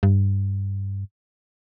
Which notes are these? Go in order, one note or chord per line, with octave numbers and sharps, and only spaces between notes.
G2